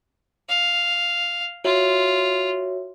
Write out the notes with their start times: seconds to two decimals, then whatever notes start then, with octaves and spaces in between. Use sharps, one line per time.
0.49 F5
1.65 F4 F#4 C#5 E5